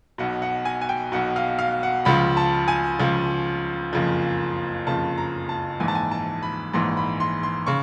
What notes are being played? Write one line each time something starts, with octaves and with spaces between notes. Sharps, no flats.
B1 B2 F#5
F#5
G#5
G#5
G5
B1 B2 F#5
F5
F5
F#5
C#2 C#3 F3 B5
A5
G#5
C#2 C#3 F3
F#1 F2 C#3 F3
F#1 F2 C#3 F3 A5
A#5
A5
A#1 G#2 E3 G#5
A5
G#5
A5
B5
A#1 G#2 E3 C6
B5
C6
C6
C#3 C#6